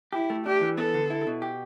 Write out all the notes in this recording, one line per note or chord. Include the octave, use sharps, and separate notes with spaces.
E4 G4
A3
D4 G4
E3
B3 A4
D3
E4
B2
G4